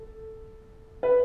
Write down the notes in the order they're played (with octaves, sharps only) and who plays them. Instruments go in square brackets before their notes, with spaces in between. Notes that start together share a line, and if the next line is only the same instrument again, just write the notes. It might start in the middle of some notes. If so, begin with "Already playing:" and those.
Already playing: [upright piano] A4
B4